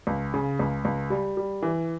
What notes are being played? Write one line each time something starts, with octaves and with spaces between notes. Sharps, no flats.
C#2
C#3
C#2
C#2
G3
G3
E3